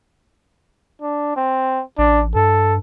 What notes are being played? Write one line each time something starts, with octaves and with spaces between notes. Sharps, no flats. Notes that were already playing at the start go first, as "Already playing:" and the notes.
D4
C4
A1 D4
G2 A4